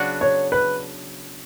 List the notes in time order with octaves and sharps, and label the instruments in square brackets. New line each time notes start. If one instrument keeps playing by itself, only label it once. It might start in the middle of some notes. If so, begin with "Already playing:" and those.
Already playing: [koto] C#3 F#3 B3 D4 F#4
[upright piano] C#5
B4